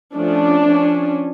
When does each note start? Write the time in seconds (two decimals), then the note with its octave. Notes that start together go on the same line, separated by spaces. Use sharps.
0.15 F3 A3 C#4 D4
0.66 F3 C#4